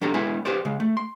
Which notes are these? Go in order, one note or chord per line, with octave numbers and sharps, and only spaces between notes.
F#3 D4 G4 A4 A#5
G#3 B3 E4 B4 C#5 G#5
G4 G#4 B4 C5 D5
C#3 G#3
A3
C6